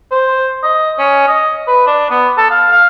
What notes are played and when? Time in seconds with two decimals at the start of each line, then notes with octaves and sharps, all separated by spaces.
0.12 C5
0.63 D#5
0.98 C#4
1.28 D#5
1.68 B4
1.87 D4
2.10 B3
2.37 A4
2.50 F5
2.72 F5